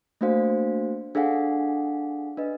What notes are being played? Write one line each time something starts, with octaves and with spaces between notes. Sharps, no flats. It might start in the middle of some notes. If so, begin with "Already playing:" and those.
A3 A#3 D4 F#4 C5 F5
D4 G#4 A4 F5 F#5
D4 B4 D#5